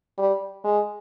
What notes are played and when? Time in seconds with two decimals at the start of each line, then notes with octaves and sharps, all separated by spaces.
0.18 G3
0.64 G#3